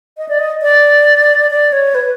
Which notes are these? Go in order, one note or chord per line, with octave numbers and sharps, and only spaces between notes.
D#5
D5
D#5
D5
D5
C#5
B4